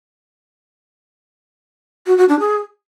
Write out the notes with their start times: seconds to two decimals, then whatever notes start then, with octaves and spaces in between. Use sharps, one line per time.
2.07 F#4
2.18 F#4
2.29 D4
2.40 G#4